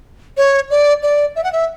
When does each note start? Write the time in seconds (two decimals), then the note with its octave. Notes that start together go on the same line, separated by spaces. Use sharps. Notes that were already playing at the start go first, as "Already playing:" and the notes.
0.37 C#5
0.70 D5
1.03 D5
1.36 E5
1.44 F#5
1.52 E5